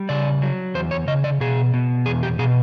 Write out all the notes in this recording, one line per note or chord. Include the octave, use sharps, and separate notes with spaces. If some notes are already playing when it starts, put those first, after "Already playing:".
Already playing: G3
C#3 D5
F#3
E2 C5
C#5
C#3 D#5
D5
B2 G#4
B2
E2 G#4
G4
B2 G#4